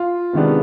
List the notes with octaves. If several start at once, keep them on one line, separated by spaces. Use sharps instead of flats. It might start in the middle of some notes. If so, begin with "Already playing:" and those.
Already playing: F4
C3 D#3 G#3 B3 D4